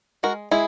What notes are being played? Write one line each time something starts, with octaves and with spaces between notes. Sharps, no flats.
G#3 F#4 A#4
G#3 E4 G#4